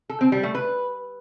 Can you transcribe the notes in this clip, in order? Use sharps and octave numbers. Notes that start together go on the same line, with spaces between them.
A4
C4
G3
A3
B4